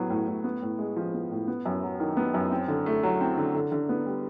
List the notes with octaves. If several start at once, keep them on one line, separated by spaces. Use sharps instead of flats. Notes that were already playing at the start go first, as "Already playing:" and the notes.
Already playing: A2 F#3 B3
A2
A2
B3
A2
G#3
F3
B3
A2
B3
F#2
F#3
D#3
B3
F#2
C4
D3
A3
F#3
C4
D3
D3
D3
B3
G3